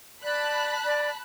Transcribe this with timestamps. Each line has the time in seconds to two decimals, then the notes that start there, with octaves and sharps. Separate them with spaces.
0.24 D5 A5 B5 F#6
0.85 D5